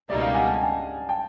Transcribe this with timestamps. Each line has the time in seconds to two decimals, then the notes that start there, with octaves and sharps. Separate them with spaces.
0.09 C#2 B2 G3 A#3 D#4 D5 E5
0.21 D#5 F5
0.34 F#5 G#5
0.47 A5
0.54 G#5
0.61 G5 A5
1.09 G5 A5